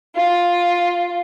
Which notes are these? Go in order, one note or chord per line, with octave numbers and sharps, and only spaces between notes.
F4